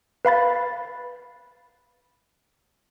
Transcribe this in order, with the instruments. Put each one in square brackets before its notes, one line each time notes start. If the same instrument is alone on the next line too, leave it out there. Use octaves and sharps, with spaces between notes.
[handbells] B4 F5 B5 A6